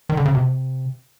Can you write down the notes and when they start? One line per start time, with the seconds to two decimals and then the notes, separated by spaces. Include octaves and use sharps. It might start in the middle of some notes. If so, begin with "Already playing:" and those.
0.09 D#3
0.17 D3
0.25 C#3
0.35 C3